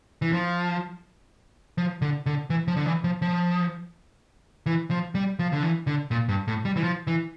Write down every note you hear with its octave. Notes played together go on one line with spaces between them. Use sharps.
E3
F3
F3
D3
D3
E3
F3
D3
E3
F3
F3
E3
F3
G3
F3
D3
E3
D3
A#2
G2
A2
G3
E3
F3
E3